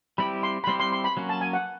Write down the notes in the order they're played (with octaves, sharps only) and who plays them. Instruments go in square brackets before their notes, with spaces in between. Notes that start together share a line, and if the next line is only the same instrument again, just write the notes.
[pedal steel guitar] G3 C4 E4 G4 [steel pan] B5
[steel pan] C6
B5
[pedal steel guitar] G3 C4 E4 G4 [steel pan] C6
[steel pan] C6
C6
B5
[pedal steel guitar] F#3 A#3 C#4 F#4
[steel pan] A5
G#5
F#5